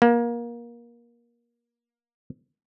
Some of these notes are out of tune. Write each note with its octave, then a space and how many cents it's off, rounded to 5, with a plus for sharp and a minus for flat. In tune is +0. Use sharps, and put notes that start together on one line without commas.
A#3 +25